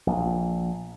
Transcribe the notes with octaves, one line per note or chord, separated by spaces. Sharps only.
A#1